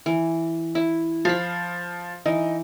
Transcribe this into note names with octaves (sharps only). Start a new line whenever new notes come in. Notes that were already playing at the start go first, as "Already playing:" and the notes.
E3
E4
F3 F5 B5
E3 D#4